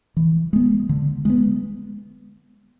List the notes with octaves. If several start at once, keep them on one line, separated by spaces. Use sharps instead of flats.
E3
G#3 B3
D3
G#3 B3